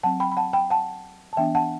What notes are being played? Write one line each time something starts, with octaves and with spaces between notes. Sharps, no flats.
F#3 C4 F#5 A5
G5 B5
B5
F#5 A5
G5 B5
F#5 A5
A5
E3 B3 D4 E5 G5
F#5 A5